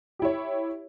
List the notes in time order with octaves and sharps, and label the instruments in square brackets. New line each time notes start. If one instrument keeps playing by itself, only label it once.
[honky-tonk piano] G4
E4
C#5